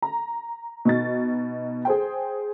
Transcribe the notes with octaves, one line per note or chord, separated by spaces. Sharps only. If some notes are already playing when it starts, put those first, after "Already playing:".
A#5
B2 D#4 A6
G#4 C5 G5